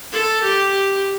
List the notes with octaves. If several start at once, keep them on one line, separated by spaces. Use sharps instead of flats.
A4
G4